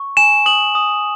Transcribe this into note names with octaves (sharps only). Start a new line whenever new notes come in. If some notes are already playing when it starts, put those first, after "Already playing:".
Already playing: C#6
G#5 E7
D#6 F#7
D#6